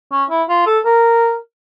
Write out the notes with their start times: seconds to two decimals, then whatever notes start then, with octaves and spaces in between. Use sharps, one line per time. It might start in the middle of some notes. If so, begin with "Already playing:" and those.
0.12 C#4
0.30 E4
0.49 F4
0.67 A4
0.85 A#4